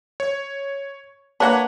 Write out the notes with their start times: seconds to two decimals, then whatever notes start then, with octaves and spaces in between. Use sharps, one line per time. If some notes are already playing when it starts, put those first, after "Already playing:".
0.20 C#5
1.40 A#3 D4 B4 C#5 F#5